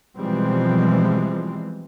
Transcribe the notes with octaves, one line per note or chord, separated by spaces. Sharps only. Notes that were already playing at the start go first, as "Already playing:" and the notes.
B2 E3 F3 G3 G#3 C4